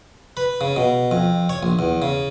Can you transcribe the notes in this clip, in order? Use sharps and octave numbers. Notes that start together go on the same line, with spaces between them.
B4
C#3
B2
F2
C#5
A#1
E2
C#3